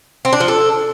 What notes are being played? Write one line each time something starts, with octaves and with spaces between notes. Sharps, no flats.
C4
D4
F3
A4